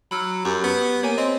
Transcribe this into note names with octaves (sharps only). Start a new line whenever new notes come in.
F#3 B5 E6 F6
F#2 G4 C#6 G6
B3
A#3 C#5 G#5
C4 D#5